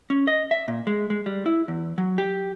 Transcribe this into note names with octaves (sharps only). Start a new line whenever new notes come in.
C#4
D#5
E5
A#2
G#3
G#3
G3
E4
E2
F#3
G4